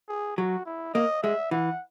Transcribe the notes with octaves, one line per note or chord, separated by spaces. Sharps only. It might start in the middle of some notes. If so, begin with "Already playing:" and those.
G#4
F#3 F#4
E4
A#3 D#5
G#3 E5
E3 F#5